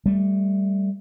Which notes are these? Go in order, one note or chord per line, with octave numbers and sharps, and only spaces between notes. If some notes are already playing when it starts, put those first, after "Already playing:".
G3 A3